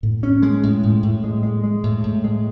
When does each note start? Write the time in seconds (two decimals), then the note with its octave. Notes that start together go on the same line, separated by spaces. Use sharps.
0.03 A2
0.23 C#4
0.42 G#3
0.63 A2
0.83 A2
1.03 A2
1.24 G#3
1.43 G#3
1.64 G#3
1.83 A2
2.04 A2
2.24 G#3